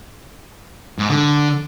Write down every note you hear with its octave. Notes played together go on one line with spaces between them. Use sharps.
G#2
D3